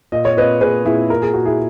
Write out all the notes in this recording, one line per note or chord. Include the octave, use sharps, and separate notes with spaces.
A#2 D#5
C#5
A#2 B4 D#5
A#2 G#4 B4
A#2 E4 G#4
A#2 A#4
G#4
A#2 F#4
E4 G#4